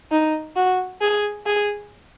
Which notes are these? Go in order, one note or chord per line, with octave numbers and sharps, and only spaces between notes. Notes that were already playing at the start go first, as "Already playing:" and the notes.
D#4
F#4
G#4
G#4